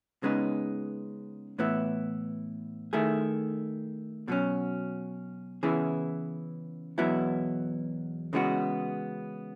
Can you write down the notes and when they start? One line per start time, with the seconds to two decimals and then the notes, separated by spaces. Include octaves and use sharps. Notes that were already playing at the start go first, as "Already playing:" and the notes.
0.23 C#3 G#3 B3 D#4
1.58 A2 E3 B3 E4
2.93 D#3 A3 E4 G#4
4.28 B2 F#3 C#4
5.63 C#3 E3 B3 E4 G#4
6.98 E2 B2 F#3 B3 E4
8.33 C#3 E3 G#3 B3 F#4